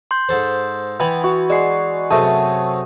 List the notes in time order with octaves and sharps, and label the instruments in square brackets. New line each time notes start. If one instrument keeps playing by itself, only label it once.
[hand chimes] C6 G6
[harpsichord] G#2 A4 C5
[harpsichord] E3 B3 [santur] G5 G#5 B5
[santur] F#4
[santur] G#3 F#5 [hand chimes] D5 C7
[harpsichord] F#2 C3 [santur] A3 G#4 [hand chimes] A5